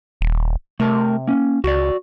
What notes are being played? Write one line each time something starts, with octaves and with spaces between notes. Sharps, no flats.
D#1
C3 A3 A#4 A5
A#3 C#4
C#2 F#4 D5